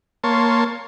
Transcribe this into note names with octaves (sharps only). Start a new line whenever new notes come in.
A#3 C#5 A5 C6